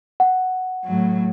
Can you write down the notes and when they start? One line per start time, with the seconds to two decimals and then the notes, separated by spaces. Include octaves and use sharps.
0.20 F#5
0.84 A2 F#3